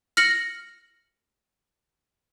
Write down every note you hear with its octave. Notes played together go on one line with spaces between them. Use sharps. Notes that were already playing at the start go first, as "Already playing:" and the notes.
F6 A#6 C#7 F#7